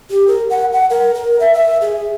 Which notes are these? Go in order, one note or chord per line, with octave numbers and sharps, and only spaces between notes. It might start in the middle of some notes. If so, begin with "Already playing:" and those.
G4
A#4
F#5
F#5
A#4
A#4
E5
E5
G#4